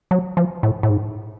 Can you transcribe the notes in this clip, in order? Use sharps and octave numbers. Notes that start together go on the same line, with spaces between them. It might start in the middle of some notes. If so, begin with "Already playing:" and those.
F#3
F3
A2
A2
G#2